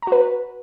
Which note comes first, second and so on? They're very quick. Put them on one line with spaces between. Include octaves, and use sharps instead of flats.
A#5 F#4 B4